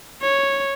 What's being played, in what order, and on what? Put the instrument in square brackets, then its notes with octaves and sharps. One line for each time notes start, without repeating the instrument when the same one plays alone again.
[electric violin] C#5